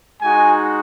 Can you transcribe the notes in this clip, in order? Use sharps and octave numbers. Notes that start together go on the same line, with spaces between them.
G#3 D#4 F#4 G#5